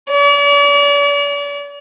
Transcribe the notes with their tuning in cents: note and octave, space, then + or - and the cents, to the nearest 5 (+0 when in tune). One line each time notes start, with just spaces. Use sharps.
D5 -45